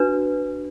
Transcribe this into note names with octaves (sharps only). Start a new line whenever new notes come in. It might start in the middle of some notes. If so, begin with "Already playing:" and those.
Already playing: D4 F#4 B4